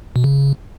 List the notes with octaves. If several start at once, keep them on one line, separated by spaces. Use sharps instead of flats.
B2
C#3